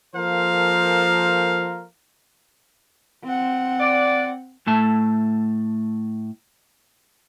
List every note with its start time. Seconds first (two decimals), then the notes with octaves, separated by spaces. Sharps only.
0.15 F3 A#3 A4 A#4 C5 F5
3.24 C4 F#5
3.79 D5
4.67 A2 A3 A5